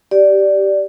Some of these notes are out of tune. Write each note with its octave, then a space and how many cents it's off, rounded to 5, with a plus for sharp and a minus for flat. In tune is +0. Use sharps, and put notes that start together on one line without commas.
G4 -10 D5 +0